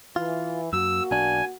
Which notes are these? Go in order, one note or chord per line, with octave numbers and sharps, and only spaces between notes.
E3 F4
F#2 A#3 F#4 E6
B1 D4 G#5